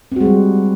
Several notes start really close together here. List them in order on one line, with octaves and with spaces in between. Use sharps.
C4 F#4 G#3 G3